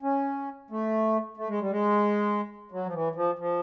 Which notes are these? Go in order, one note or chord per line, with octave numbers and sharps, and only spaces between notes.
C#4
A3
A3
G#3
G3
G#3
F#3
F3
E3
F3
F3